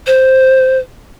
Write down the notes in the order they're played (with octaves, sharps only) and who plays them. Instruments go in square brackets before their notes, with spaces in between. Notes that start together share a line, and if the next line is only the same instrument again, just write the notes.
[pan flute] C5